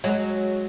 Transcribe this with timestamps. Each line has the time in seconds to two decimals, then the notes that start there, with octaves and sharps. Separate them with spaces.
0.04 F#3 G#3